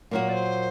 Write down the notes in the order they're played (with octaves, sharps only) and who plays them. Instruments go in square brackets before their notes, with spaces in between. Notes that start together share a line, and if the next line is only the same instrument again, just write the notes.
[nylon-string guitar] A#2 F#3 A#3 F#4 [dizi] A#4
[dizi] D5
C5